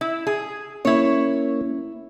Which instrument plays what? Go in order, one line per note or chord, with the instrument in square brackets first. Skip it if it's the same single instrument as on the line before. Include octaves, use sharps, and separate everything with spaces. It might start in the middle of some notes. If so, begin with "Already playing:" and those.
[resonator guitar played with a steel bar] E4
G#4
[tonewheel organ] A#3 C#4 [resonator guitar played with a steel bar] E4 C#5